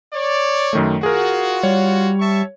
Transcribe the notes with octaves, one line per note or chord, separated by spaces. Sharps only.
C#5 D5
F#2 D#3 A3
F4 F#4 G#4 A#4
G3 C#5
E5 A5 C#6